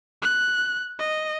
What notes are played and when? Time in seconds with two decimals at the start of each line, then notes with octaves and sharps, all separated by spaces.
0.22 F#6
0.99 D#5